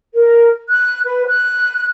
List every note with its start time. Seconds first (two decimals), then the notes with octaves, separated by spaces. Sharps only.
0.14 A#4
0.69 F#6
1.05 B4
1.26 F#6